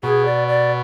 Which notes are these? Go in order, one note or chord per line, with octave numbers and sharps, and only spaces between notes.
B2 G#4
D5
D5